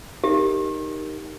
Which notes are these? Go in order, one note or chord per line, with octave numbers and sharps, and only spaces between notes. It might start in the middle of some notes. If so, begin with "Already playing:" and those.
D#4 G4 A#4